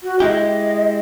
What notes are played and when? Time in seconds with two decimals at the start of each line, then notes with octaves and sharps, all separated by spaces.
0.03 F#4
0.20 G#3 E4 G4 D#5